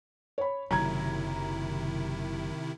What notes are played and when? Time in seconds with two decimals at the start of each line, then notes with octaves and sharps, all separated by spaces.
0.38 C#5 B5
0.71 F#1 C3 D#3 F#3 E4 A#5 G#6